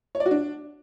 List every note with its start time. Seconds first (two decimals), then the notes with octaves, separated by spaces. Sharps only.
0.15 C#5
0.20 D5
0.26 F#4
0.31 D4